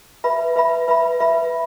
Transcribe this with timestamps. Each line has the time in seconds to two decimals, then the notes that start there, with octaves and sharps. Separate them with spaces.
0.24 B4 E5 B5
0.56 B4 E5 B5
0.88 B4 E5 B5
1.20 B4 E5 B5